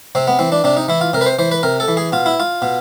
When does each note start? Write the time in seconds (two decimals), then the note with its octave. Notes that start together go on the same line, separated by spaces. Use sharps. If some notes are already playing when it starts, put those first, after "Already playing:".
0.15 C3 C4
0.27 B3
0.39 E3 C4
0.52 D4
0.64 C3 D4
0.77 D#4
0.88 E3 E4
1.01 F4
1.13 C3 A#4
1.21 B4
1.26 C5
1.39 E3 C5
1.51 B4
1.63 C3 A#4
1.80 A4
1.88 E3
1.97 G#4
2.12 B2 F4
2.26 E4
2.40 F4
2.62 B2